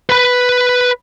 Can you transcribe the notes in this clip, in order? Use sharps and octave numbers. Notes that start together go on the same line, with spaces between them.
B4 B5